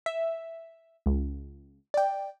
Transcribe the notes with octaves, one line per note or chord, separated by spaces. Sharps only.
E5
C#2
D5 G5